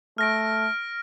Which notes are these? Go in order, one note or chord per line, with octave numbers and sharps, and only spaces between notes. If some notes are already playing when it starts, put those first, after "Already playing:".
A3 F6 A#6 D7